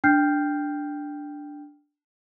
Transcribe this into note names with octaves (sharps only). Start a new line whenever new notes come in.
D4 G5 F6 G6 C7